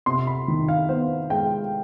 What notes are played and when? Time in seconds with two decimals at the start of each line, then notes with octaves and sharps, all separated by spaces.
0.06 C3 C6
0.27 B5
0.48 D#3
0.69 F5
0.89 B3 C5
1.30 G#3 G5